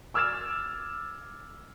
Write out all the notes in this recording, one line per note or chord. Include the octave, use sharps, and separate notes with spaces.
D6 E6 F6 G#6 A6 E7